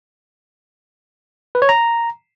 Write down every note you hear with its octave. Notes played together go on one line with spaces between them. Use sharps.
B4
C#5
A#5